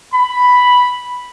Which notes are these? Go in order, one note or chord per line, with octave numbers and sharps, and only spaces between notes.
B5